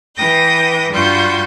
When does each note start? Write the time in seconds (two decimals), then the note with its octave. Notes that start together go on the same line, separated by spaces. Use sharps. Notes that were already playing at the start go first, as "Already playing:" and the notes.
0.16 E3 B4 G5 D#6 G6 A#6
0.91 G2 G3 F4 F#4 C6 G6